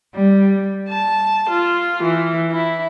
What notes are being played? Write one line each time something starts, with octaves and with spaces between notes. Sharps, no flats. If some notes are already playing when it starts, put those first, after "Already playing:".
G3
A5
F4
E3
E4